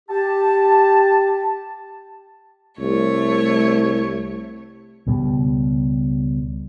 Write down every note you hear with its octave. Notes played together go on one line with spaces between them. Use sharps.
G4 A5
C2 A3 C#5
C#2 B2 G3